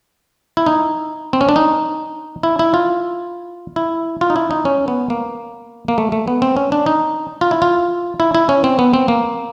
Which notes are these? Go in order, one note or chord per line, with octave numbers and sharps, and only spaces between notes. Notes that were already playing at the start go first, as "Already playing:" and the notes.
E4
D#4
C4
C#4
D4
D#4
E4
E4
F4
E4
F4
D#4
E4
D#4
C#4
B3
A#3
A#3
A3
A3
B3
C4
C#4
D4
D#4
F4
E4
F4
E4
E4
C#4
C4
B3
C4
A#3